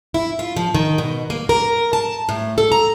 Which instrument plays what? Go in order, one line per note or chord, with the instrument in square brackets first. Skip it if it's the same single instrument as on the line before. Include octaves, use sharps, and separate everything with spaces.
[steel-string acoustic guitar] E4
F4
F3
D#3
B2
A#3
A#4
A5
A2
A4
A#5